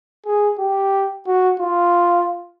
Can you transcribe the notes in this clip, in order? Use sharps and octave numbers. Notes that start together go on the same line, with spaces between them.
G#4
G4
F#4
F4